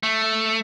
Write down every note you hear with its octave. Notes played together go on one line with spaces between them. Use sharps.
A3